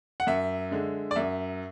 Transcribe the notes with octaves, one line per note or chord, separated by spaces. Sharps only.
F#5
F#2 E5
D3 G#3
D5
F#2 E5